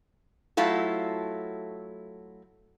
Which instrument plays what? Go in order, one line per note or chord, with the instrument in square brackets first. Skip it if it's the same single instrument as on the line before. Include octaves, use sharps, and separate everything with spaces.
[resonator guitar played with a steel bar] F#3 A3 E4 F4 A4